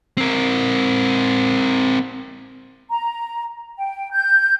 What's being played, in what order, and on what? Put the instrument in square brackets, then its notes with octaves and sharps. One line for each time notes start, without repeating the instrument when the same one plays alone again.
[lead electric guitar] C4 A#4
[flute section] A#5
G5
G6